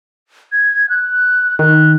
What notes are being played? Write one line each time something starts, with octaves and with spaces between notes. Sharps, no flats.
G#6
F#6
D#3 F#6